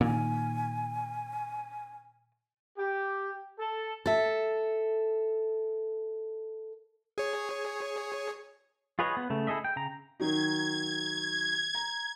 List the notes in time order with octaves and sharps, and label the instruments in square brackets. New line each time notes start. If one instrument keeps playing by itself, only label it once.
[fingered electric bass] A#2 D#3 [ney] G#5
[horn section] G4
A4
[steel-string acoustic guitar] A4 E5
[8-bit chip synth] G#4 C#5
[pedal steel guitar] F4 G#4 B4 C#5 D#5
B3
C#3 A3
E4 G#4 A4 D#5 E5
G5
C#3 A#5
[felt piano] D#3 F#3 D#4 [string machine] G#6
[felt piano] A#5